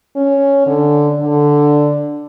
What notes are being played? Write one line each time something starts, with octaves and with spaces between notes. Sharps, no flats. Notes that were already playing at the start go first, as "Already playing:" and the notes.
C#4
D3
D3